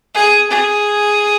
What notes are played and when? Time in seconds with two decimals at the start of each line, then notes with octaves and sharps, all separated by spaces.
0.14 G#4
0.50 G#4